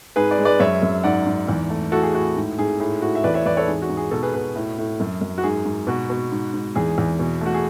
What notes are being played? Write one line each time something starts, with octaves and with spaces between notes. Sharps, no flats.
G#2 G#4 B4
B4 D5
G#3
B4 D5
F#2 C#5 E5
F#2
G#2 D5 F#5
G#2
E2
A3
A2 F#4 A4
G#4
A2 F#4
G#2
G#2 G#4
A2 G#4
A2 F#4
E5
E2 B4 D5
C#5 E5
E2 B4 D5
A4 C#5
G#2 G#4
F#4
G#2
G#4
B2 F#4 A4
G#4 B4
B2 G#4 B4
A2
A2
F#2
F#2
F#4
G#2 G#4
G#2
B2 F#4
B2
G#2
G#2
E2 G#4
E2
B2
A3 F#4
G#4